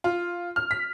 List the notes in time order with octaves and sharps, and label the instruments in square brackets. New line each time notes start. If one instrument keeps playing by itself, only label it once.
[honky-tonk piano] F4
F6
B6